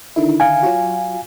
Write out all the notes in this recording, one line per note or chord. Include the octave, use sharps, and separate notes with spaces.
D3 D#3 E4
F5 G#5
F#3 F4 F#4